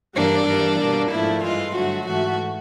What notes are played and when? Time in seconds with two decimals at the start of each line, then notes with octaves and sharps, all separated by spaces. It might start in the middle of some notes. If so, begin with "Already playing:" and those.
0.16 G2 E3 G3 A#3 D4
0.47 G2 E3 G3 A#3
0.79 B2 G3 A#3
1.11 G#2 F3 A3 E4
1.42 G2 E3 G#3 F4
1.74 G2 D3 F#3 A3 F#4
2.06 G#2 E3 A3 F#4